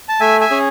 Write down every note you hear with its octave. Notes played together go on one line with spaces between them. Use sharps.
A5
A3 E5 G#5
E5 G#5
C#4 G#4